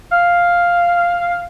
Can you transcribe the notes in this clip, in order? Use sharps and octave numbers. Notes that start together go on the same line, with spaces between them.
F5